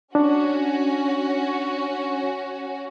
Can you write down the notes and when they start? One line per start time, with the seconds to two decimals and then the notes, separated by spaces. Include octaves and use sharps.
0.15 C#4 D4 F#4